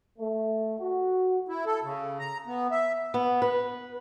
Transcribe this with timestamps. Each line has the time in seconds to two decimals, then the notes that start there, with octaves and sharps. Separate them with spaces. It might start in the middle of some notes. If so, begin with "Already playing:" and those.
0.19 A3
0.80 F#4
1.48 E4
1.66 A4
1.84 C#3
2.19 A#5
2.47 B3
2.71 E5
3.14 B3
3.42 B4